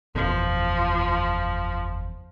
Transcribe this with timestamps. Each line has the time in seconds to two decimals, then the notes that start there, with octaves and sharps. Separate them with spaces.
0.15 F#1 E2 B2 F3